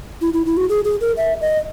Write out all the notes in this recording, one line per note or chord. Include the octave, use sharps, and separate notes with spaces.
E4
E4
E4
F#4
G#4
G#4
A#4
E5
D#5